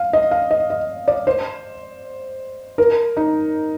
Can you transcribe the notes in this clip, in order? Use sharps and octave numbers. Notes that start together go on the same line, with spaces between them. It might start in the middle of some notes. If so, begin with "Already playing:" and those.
Already playing: F5
D#5
F5
D#5
D#5
D5
C5
A#4
D#4